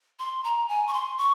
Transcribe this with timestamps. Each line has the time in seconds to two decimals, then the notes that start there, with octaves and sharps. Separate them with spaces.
0.19 C6
0.44 A#5
0.69 G#5
0.87 C#6
0.94 C6
1.18 C#6